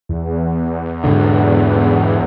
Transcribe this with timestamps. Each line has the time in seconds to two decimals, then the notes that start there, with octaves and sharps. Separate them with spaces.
0.09 E2
1.04 G#2 B2 D3
1.28 E2